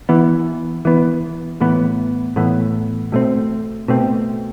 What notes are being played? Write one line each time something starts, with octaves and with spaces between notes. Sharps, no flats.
E3 B3
E3 B3
A2 E3 B3
A2 E3 B3
B2 A3 C4
B2 A3 C4